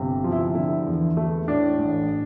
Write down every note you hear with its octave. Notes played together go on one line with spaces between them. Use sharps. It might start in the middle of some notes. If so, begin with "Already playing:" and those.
Already playing: G1 C3
F3
E4
D3 E4
E2
A3
A2 D4
A1